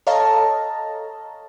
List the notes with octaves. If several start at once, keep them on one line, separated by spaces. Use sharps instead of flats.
A4 C#5 D#5 F5 A5 A#5